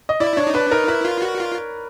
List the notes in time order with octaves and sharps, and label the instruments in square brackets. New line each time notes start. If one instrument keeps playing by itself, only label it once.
[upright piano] D#5
[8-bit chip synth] E4 [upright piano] D5
[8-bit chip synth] D4 [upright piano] C#5
[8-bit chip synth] D#4
[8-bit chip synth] D4 [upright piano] B4
[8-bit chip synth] D#4 [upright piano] A#4
[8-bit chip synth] E4 [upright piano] B4
[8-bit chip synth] F4
F#4
F4